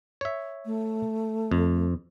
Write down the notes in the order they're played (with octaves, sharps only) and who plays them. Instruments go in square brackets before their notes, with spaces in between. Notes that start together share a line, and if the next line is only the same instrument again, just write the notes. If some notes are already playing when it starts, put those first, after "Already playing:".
[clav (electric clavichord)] C#5 E5
[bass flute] A3
[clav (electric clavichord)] F2